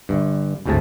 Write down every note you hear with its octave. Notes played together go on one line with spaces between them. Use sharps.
G1 G2
G#1 D2 A2 C3 G#4 A5